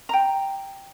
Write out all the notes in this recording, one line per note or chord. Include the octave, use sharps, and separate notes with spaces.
G5 A#5